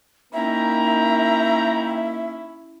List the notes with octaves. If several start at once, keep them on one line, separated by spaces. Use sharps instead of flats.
A#3 C#4 D#4 E4 E5 G5 A#5